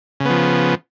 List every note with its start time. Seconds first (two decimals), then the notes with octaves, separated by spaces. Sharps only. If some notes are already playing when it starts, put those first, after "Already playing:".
0.20 C#3
0.25 B3
0.30 F3